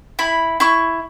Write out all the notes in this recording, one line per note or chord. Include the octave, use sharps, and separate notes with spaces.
E4 B5
E4 C#6